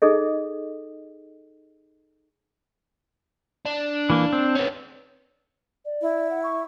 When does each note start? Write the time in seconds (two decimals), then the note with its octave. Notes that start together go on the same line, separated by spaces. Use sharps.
0.02 D#4 G#4 A4 D#5
3.66 D4
4.10 E3 A#3
4.33 C4
4.55 B3 C#4
5.85 D5
6.02 E4
6.30 F#5
6.43 C#6